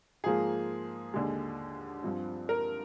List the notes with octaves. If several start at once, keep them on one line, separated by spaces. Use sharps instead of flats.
G#2 F3 A#3 G#4
D#2 D3 G#3
G2 F3 C4
A#4